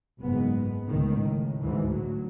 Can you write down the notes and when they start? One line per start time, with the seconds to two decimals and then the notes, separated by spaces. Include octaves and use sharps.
0.21 F#1 G#2 G#3 B3
0.87 C#2 A2 D#3
1.21 A2
1.60 D2 G#2 E3
1.90 D2 A2 F#3